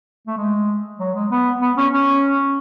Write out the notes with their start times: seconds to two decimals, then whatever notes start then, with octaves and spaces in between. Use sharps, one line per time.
0.27 A3
0.37 G#3
0.99 F#3
1.15 G#3
1.30 B3
1.61 B3
1.77 C#4
1.92 C#4